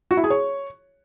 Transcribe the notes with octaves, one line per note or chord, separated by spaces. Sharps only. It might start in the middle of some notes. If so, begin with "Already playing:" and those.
F#4
E4
G#4
C#5